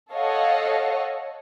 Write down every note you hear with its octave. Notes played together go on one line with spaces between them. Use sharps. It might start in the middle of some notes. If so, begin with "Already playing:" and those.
A4 C#5 D#5 F5 F#5